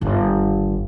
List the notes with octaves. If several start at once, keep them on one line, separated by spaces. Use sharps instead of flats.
G1 D#2